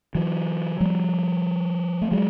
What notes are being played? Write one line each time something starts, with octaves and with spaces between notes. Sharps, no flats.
E3 F#3
F3 G3
A3
F#3 G#3